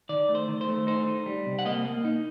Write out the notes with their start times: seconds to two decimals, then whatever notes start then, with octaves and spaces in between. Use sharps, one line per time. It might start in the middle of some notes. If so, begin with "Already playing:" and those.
0.09 D#3 D5
0.29 A3
0.35 C5
0.48 D#3
0.61 C5
0.68 A3
0.87 D#4 C5
1.07 D#4
1.26 G3
1.46 C3
1.59 F#5
1.66 A#3 D#5
1.85 A#3
2.05 D#4